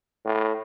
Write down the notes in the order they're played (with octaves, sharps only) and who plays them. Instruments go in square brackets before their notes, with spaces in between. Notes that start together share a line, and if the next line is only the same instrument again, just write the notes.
[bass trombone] A2